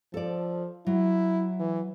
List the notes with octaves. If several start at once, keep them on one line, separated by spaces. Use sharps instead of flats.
F3 A4 D5
F#3 E4
E3